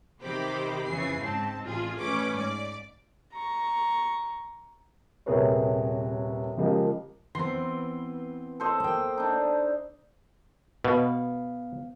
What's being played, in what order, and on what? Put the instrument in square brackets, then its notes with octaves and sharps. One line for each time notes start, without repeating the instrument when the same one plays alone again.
[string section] C3 D#3 G4 C5 B5 D6
F2 C#3 E3 G#5 C7
G#2 C4 A5
A1 F4 G#4
A1 A3 C#4 B4 D6
G#2 D5 D6
[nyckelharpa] A#5 C#6
[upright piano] D#1 C3 G#4 A#4 B4 C#5
C#3 F3 G#3 A#3 G4
[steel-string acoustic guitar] E3 B3 C4 [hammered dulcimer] C6
[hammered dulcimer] A4 C5 D#5
[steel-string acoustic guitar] A#3 G5
[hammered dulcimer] D4 D#4
[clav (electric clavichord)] B2 [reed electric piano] B3 F5